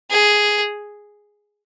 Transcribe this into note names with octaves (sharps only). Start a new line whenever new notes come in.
G#4